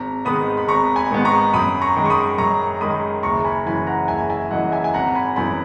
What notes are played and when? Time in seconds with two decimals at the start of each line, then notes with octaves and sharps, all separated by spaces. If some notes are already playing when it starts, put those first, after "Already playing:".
Already playing: G#1 A#5
0.25 G#2 D#3 G#3 B3 B5 D#6
0.57 B5
0.68 G#1 A#5 C#6
0.96 G#5 B5
1.11 G#2 D#3 G#3 B3
1.25 A#5 C#6
1.54 F#2 B5 D#6
1.81 A#5 C#6
1.96 D#3 G#3
2.05 C#6
2.10 B5 D#6
2.38 F#2 A#5 C#6
2.80 D#3 G#3 B5 D#6
3.23 F#1 A#5 C#6
3.45 G#5 B5
3.66 F#2 E3 G#5 B5
3.87 F#5 A#5
4.08 F#1 E5 G#5
4.30 E5 G#5
4.51 F#2 E3 D#5 F#5
4.72 E5 G#5
4.84 G#5
4.94 G#1 F#5 A#5
5.15 G#5 B5
5.36 F#2 E3 B3 G#5 B5